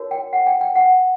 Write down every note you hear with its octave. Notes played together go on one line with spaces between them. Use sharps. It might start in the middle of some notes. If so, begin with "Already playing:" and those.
Already playing: D#4 F#4 A#4 C#5
G5
F#5
G5
G5
F#5